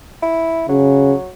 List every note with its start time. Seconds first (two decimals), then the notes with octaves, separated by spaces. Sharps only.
0.23 E4
0.69 C#3 F#3